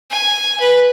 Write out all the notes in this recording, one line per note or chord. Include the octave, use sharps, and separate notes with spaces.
G#5
B4